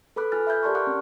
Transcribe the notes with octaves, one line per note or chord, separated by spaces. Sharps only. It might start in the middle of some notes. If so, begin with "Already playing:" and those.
A4 B4 B5 D6 F#6
F4 A4 G#5 F6 F#6 A6
E5 B5 F6 G6 G#6
G4 A#4 D5 A5 C6 C#6
F#5 A5 C#6 D6 F6 F#6
C#4